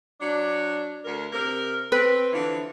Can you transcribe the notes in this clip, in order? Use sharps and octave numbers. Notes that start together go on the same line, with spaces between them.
F#3 D4
D2 A#4
C3 A#4
C4 B4
D3 E3 F3